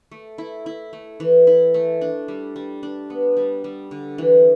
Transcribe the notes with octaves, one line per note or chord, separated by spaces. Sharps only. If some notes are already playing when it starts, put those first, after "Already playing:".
A3
E4
E4
A3
E3
E4
A3
D4
G3
G3
D4
B3
G3
G3
D3
E3